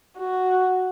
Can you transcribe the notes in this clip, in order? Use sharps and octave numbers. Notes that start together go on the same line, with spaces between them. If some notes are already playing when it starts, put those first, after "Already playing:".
F#4